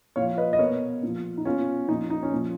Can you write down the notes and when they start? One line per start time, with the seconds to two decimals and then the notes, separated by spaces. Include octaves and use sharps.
0.16 A#2 C#5 F5
0.21 F3
0.38 B4 D#5
0.53 D#5
0.59 B2 A#4 C#5
1.03 A#2 F3
1.38 D#4
1.45 B2 C#4 F4
1.88 A#2 F3 D#4
2.10 D#4
2.23 C#4
2.33 A#2 F3